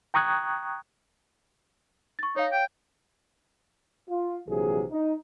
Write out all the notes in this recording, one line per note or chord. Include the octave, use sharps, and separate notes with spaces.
G5 A#5 C#6 D#6 F#6 G#6
C#6 A6
D#4 C#5 F5
G5
F4
A#1 C3 E3 F#3 G#4
D#4